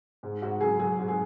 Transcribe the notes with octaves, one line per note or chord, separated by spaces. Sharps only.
G#2
G#2 F#4
F#3 G#4
F#3 G#4
G#2
G#4